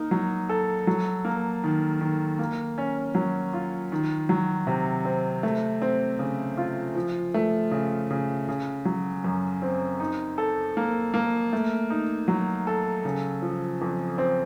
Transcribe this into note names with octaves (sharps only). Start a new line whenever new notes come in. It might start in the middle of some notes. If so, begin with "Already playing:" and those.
Already playing: A#3 D#4
F#3
A4
F#3
A#3
D#3
D#3
A#3
C#4
F#3
F4
D#3
F#3
C3
C4
A3
C4
C#3
F4
F3
A3
C#3
C#3
C#3
F#3
F#2
C4
D#4
A4
A#3
A#3
A3
D#4
F#3
A4
C#3
F3
F2
C4